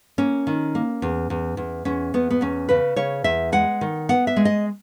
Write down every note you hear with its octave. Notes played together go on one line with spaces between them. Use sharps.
A#3 C#4
D#3
A#3
E2
E2
E2
E2 C#4
E2 B3
B3
E2 C#4
C#3 B4
C#3 C#5
E2 E5
G#3 F#5
D#3
B3 F#5
E5
G#3
D#5